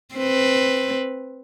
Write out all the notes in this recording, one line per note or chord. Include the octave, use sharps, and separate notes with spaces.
C4 B4